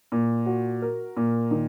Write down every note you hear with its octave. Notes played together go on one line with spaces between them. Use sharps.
A#2
F#4
A#4
A#2
D#3